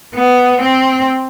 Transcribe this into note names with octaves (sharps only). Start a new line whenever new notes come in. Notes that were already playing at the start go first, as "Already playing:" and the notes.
B3
C4